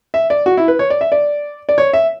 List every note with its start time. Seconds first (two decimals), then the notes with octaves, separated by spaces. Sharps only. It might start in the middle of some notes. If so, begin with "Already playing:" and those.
0.14 E5
0.30 D5
0.46 F#4
0.57 E4
0.68 B4
0.79 C#5
0.90 D5
1.01 E5
1.12 D5
1.69 D5
1.78 C#5
1.93 E5